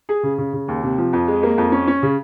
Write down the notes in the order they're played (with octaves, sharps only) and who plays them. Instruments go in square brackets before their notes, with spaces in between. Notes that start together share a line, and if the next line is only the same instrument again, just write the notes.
[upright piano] G#4
C#3
C#3
C#3
D#2
C3
F3
F2
G#3
A#3
F2
C#4
C#4
C#3